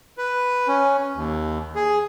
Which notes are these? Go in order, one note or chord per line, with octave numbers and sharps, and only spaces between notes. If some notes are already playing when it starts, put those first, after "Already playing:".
B4
C#4
D#2
G#4